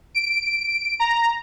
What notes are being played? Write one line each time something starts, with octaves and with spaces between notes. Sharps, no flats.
D7
A#5